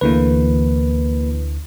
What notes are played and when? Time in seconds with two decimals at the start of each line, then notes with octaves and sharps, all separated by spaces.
0.01 D2 D3 E3 A#3 B4